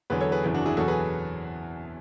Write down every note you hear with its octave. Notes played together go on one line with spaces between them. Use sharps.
E2 D3 F#3 G#4 B4
A4 C#5
G#4 B4
G#1 F#2 C#3 E3
D4 F#4
E4 G#4
E2 B2 F#3 F#4 A4
G#4 B4